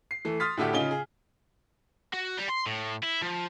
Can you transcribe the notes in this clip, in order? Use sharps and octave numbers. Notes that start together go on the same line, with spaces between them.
C7
E3 A3
C6 D#6 F6 A6 B6
A2 D3 A3 E4 F#4 G4
C#3 C#4 D#4 F4 F5 G7
G#4
F#4
G3
C6
A2
E4
F3